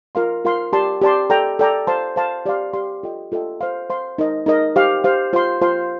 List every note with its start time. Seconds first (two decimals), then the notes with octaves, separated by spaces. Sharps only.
0.15 F4 A#4 F5 C6
0.45 F4 A#4 F5 C6
0.73 G4 D5 A5 C6
1.01 G4 D5 A5 C6
1.30 A4 D5 G5 A#5
1.59 A4 D5 G5 A#5
1.87 C5 F5 A5 C6
2.16 C5 F5 A5 C6
2.46 G4 D5 F5 C6
2.73 G4 D5 F5 C6
3.03 F4 A4 D#5 G5
3.32 F4 A4 D#5 G5
3.61 C5 F5 C6
3.90 C5 F5 C6
4.18 D#4 A#4 D#5
4.46 D#4 A#4 D#5
4.76 G4 C5 F5
5.04 G4 C5 F5
5.33 F4 C5 F5 C6
5.61 F4 C5 F5 C6